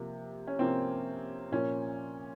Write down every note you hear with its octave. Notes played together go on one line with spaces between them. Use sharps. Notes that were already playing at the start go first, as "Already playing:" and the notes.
Already playing: C3 F3 A#3
C#4
C3 F3 A#3 C4
A#2 F3 A#3 C#4